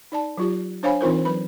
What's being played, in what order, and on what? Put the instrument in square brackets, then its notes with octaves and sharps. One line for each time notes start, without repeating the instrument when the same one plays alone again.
[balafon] D#4 D5 A5
F#3 F4 G4
D4 C5 C#5 F5 G#5 B5
E3 C4 D#4 F4 A#4 C5
F#3 B4 B5